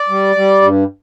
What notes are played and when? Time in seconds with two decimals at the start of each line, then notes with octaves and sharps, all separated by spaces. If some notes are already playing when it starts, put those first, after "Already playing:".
Already playing: D5
0.09 G3
0.36 G3
0.62 G2